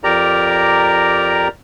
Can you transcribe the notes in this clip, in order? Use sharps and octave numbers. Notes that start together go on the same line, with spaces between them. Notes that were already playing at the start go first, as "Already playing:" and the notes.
F2 G4 A#4 D5 A#5